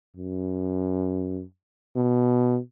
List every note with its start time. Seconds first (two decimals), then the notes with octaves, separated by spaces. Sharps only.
0.16 F#2
1.96 B2